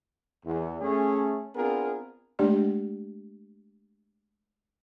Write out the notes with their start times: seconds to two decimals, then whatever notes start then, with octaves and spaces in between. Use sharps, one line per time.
0.45 E2
0.81 A3 C#4 G#4
1.56 B3 C4 D4 F4 G#4 A#4
2.39 G#3 A3 D4 G4 D5